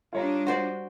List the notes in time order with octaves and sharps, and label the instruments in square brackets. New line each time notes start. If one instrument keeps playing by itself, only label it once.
[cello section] G3 D4 D#4 [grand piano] F4 C#5 A#5
[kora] F#4 C5 D5